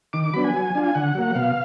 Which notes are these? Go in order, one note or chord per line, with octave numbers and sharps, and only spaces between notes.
D#3 D6
D6
F#3 B3 D4 B5
G#5
F#3
D4 F4
G#5
D3 F#5
F#3 A#3
B2 F5